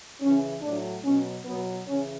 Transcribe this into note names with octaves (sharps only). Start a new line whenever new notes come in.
C#3 E3 C#4
A2 F#3 D4
B2 F#3 C#4
B2 F#3 B3
C#3 E3 C#4